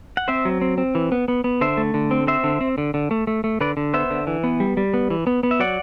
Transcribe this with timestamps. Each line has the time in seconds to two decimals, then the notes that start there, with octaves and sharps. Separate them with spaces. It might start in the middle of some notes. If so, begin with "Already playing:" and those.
0.17 F#5
0.28 C4 C5 E5
0.45 F#3
0.61 C4
0.78 C4
0.95 E3
1.12 B3
1.28 B3
1.44 B3
1.61 D3 C5 E5
1.77 A3
1.94 D3
2.11 C4
2.27 C4 C5 E5
2.44 D3
2.61 C4
2.78 D3
2.94 D3
3.11 A3
3.27 A3
3.44 A3
3.61 D3 B4 D5
3.77 D3
3.94 B3 C5 E5
4.10 D3
4.27 E3
4.44 B3
4.60 G3
4.77 G3
4.94 B3
5.10 E3
5.27 B3
5.43 B3
5.51 E5
5.60 F#3 D5 F#5